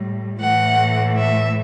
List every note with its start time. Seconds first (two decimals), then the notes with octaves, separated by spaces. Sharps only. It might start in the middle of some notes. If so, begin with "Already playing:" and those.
Already playing: A2 G3
0.40 A2 E3 A3 F#5
1.17 E5